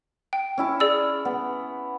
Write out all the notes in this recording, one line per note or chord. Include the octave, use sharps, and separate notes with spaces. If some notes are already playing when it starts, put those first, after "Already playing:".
G5
C#4 E4 A5
G#4 D5 E6
B3